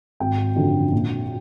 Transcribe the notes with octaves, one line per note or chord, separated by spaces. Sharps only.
G#1 G5
F#2 D3 F3
A#1